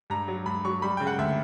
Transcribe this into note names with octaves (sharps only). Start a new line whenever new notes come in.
G2 A#5
F#3
G2 B5
F#3 C#6
G3 B5
C#3 G5
F#5
D2 E5